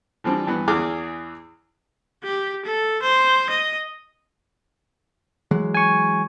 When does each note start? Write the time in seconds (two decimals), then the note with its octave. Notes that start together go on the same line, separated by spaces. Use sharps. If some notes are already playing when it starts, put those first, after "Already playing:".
0.24 E3 F3 G3 C4 D4
0.47 G2 E3 B3
0.68 E2 E3 G#4 D6 F6
2.24 G4
2.65 A4
3.02 C5
3.50 D#5
5.51 E3 F#3 G#3
5.74 G#5 C#6